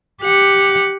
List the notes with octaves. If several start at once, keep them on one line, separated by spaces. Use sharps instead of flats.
G4 F#5